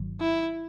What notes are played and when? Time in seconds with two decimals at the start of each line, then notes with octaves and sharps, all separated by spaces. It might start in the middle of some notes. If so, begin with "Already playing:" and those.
Already playing: G1 G2 D#3 F#3
0.21 E4